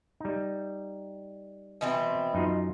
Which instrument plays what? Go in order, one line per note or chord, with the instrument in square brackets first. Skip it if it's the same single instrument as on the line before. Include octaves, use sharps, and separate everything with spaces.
[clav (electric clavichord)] G3 D#4
[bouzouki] B2 E3 C4
[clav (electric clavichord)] F#2 D#4 F4